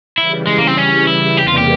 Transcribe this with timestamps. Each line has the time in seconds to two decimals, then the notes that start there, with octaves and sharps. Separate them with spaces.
0.18 C#3 E3 G3 E4
0.47 G#3
0.58 A#3
0.67 C4
0.77 C#4
1.07 E4
1.37 E2 C3 E3 G3 A#3 G4
1.48 F4
1.58 G4